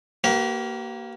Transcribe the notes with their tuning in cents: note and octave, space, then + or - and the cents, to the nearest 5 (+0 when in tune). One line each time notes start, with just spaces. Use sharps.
A#3 +0 G4 -40 B4 +20